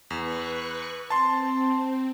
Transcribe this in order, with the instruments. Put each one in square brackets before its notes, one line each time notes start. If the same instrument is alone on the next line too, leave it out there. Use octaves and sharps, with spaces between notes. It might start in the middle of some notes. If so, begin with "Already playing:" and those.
[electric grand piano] E2 [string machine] B4 C#6 F#6
[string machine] C4 [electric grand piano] A5 C6